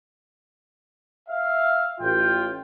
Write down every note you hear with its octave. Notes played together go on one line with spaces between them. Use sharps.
E5 F5
A1 F4 G5